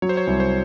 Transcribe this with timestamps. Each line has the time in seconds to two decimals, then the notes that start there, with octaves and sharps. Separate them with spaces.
0.02 F#3 C#5
0.09 C5
0.17 C#5
0.27 C2
0.40 C5